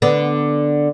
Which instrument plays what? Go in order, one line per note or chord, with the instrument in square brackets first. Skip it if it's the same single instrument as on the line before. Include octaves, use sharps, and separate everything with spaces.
[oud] D3 B3